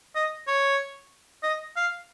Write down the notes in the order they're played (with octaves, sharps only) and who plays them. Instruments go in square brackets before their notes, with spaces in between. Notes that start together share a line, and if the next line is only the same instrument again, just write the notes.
[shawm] D#5
C#5
D#5
F5